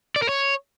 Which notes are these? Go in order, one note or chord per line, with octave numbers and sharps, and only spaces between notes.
D5
A#4
C#5